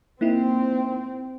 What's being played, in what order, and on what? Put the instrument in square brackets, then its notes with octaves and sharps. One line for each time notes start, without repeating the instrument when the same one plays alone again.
[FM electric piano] A#3 D#4 E4 [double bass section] C4